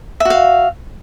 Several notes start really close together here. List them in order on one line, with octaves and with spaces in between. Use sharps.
E5 F#4 F5